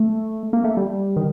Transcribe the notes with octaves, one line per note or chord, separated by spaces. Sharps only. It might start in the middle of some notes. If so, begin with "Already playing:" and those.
Already playing: A3
A#3
A3
G3
D#3